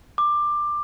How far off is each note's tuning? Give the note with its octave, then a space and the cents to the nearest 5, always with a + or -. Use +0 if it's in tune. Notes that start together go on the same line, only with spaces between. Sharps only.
D6 +15